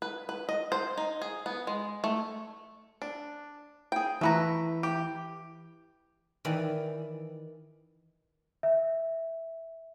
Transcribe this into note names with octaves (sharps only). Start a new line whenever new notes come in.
B4
B4
D#5
C5
D#4
G#4
B3
G#3
A3
D4
G#4 G5
E3 A3 E4 B4 A#5
G4
D#3 E3 D5
E5